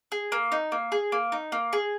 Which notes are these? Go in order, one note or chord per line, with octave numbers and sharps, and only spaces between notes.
G#4
A#3
D#4
A#3
G#4
A#3
D#4
A#3
G#4